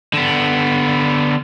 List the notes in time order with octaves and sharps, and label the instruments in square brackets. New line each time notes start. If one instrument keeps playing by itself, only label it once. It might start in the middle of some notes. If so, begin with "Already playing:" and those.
[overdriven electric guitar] D3 B3